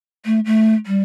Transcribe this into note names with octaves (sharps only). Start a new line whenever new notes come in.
A3
A3
G3